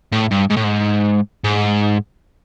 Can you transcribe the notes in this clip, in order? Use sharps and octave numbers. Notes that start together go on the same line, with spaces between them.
A2
G2
G#2
A2
G#2
G#2